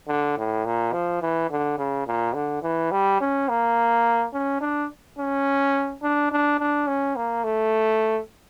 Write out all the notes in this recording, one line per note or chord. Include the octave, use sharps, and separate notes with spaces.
D3
A2
A#2
F3
E3
D3
C#3
A#2
D3
E3
G3
C#4
A#3
C#4
D4
C#4
D4
D4
D4
C#4
A#3
A3